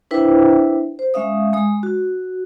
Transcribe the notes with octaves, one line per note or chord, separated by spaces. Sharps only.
D4 E4 B4 C5 E5 G5
C5
G#3 C#4 E5 F5 D#6
G#3 D#6
F#4